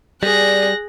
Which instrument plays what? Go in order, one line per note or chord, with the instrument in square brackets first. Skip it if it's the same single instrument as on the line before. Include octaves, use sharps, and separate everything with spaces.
[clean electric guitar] G3 [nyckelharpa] G#4 [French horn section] D5 [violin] F#6 A#6